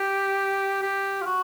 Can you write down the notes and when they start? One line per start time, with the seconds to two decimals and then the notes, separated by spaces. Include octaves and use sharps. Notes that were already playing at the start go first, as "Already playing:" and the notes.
Already playing: G4
0.82 G4
1.22 F4
1.26 F#4